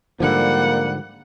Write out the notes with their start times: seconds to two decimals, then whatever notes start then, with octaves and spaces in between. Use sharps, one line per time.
0.20 G#2 D3 F3 G3 A#3 F#5